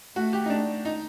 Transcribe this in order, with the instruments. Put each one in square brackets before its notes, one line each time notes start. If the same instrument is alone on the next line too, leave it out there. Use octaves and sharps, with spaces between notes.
[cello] A3 [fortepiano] F#4
[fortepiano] G4
D#4
D4
D#4